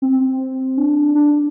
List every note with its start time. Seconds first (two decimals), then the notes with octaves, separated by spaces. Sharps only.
0.02 C4
0.78 D4
1.15 D4